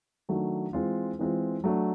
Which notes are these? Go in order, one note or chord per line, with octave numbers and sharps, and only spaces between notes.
D#3 F#3 A3 D4
E3 G#3 C4 F4
E3 G#3 C4 F4
F#3 A3 D4